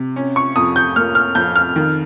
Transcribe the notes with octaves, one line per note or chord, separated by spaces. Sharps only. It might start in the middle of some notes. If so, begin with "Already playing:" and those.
Already playing: C3
C#4
C#6
F2 D#6
G6
A#3 F6
F6
F2 G6
F6
D#3